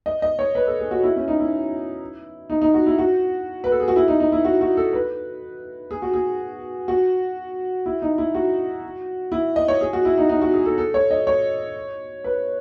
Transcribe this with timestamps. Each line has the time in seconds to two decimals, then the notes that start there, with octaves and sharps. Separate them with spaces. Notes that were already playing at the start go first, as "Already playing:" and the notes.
0.06 D#5
0.22 D#5
0.39 C#5
0.55 B4
0.67 A4
0.79 G#4
0.91 F#4
1.03 E4
1.16 C#4
1.28 D#4
1.40 E4
2.50 D#4
2.62 D#4
2.74 F#4
2.86 E4
2.98 F#4
3.64 B4
3.72 A4
3.80 G#4
3.88 F#4
3.96 E4
4.08 D#4
4.20 D#4
4.32 E4
4.45 F#4
4.61 F#4
4.77 A4
4.93 B4
5.91 G#4
6.02 F#4
6.14 G#4
6.88 F#4
7.86 E4
8.02 D#4
8.18 E4
8.35 F#4
9.32 E4
9.56 D#5
9.68 C#5
9.81 G#4
9.93 F#4
10.05 E4
10.18 D#4
10.29 D#4
10.42 F#4
10.54 G#4
10.66 A4
10.78 A4
10.94 C#5
11.11 D#5
11.27 C#5
12.24 B4